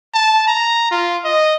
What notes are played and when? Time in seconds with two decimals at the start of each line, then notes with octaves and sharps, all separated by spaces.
0.14 A5
0.47 A#5
0.91 F4
1.25 D#5